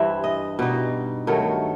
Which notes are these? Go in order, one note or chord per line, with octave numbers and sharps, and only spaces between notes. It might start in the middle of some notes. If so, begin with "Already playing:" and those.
Already playing: G2 E3 G3 C5 E5
D#5
B2 G3 D#4
G2 D#3 F#3 A3